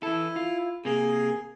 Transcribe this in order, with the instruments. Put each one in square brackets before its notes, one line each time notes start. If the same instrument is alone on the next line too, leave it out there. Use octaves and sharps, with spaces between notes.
[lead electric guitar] E3 A4 [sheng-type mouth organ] E4
[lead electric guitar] F4
[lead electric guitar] C3 A#3 [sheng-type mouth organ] G#4